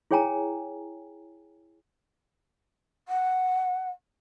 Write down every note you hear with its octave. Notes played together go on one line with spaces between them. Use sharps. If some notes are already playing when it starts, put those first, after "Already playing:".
E4 G#4 C#5 G5 G#5 A#5
F#5